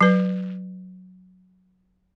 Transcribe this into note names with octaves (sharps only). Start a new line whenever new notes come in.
F#3 B4